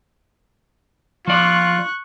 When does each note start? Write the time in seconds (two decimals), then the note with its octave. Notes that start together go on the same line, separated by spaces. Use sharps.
1.27 F3 F4 D5 C#6 F#6